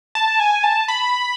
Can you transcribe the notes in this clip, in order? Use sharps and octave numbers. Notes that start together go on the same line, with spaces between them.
A5
G#5
A5
B5